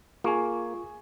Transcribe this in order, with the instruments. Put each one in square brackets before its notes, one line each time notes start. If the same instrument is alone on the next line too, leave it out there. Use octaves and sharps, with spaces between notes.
[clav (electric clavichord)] A#3 [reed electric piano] F4 C#6 [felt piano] G#4 G#5